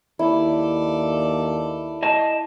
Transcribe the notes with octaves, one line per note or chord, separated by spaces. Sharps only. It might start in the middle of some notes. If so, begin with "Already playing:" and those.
D#2 E4 A4 D5
D#5 A5